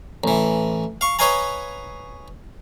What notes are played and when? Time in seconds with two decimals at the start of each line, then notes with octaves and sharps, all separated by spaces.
0.24 A1 E3
1.01 F5 C#6
1.19 B4 C#5 D#5 F5 G#5 A#5